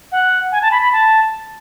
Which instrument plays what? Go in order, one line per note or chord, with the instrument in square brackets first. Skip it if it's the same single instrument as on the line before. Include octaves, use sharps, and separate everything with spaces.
[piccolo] F#5
G#5
A5
B5
B5
A5